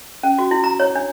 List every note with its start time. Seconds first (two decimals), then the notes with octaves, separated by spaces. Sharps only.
0.23 C#4
0.39 F#4
0.51 E4
0.64 A#5
0.80 C#5
0.95 D4